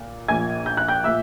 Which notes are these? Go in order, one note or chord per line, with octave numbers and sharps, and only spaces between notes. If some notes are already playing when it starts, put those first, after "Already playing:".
Already playing: A#2
A#1 A#2 G#5 G#6
G6
F#6
G5 G6
A#2 E5 E6